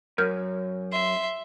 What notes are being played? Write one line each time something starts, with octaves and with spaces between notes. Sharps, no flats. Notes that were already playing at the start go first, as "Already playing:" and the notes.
F#2 A#4 F6 G6
E5 C6